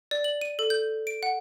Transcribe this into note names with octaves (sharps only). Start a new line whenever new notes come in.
D5
F#7
D#7
A4
G6
D7
F#5